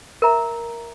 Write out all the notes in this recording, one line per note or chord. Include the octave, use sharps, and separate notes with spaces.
A#4 E5 A#5